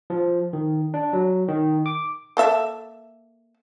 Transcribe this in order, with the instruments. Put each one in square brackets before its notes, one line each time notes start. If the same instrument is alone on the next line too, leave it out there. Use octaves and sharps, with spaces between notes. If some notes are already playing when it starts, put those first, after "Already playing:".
[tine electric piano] F3
D#3
D4
F#3
D#3
D6
[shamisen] A#3 A4 E5